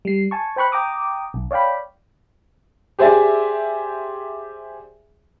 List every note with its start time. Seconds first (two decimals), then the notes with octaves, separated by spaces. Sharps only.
0.05 G3 C7
0.31 G#5 A5 C#6
0.56 C5 G5 B5 C#6 F#6
0.72 G5 A#5 D6 D#6
1.34 B1
1.51 C#5 D5 F5 G5 B5
2.99 G4 G#4 C5 D5 E5 G#5